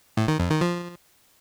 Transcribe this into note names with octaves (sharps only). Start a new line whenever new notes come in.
A2
D#3
F2
D#3
F3